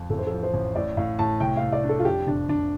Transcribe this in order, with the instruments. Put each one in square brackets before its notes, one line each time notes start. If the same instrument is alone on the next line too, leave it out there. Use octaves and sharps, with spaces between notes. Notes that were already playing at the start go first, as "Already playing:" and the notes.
Already playing: [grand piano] F2
[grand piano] A1 [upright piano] A4
[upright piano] C5
A4
[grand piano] F3
[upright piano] C5
[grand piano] A1
[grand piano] A2 [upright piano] D5
[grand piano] A2 [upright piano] F5
[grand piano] A2 [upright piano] A5
[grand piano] C2 [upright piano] G5
[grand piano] A3 [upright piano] F5
[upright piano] D5
[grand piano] D4
[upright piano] A4
F4
[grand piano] F2 [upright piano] G4
[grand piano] F1 [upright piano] D4
[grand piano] F1 [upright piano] D4